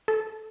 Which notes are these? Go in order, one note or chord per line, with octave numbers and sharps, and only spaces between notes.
A4